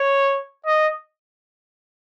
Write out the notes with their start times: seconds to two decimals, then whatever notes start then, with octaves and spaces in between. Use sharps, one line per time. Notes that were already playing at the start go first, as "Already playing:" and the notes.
Already playing: C#5
0.66 D#5